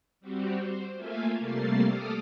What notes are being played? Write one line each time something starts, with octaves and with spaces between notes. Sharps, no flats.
G3 C4 F#4 G4
C5
A3 A#3 F4 E5 F5 G#5
C3 G3 A3 A#3 A6 C7
A4 D6 D#6 F6